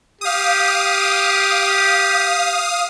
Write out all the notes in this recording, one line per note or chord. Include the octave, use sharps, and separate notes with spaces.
G4 F5 D#6